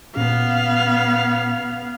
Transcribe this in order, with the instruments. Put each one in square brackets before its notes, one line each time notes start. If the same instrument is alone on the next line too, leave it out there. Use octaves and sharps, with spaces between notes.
[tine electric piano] A#2 C#4 [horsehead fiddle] B3 F5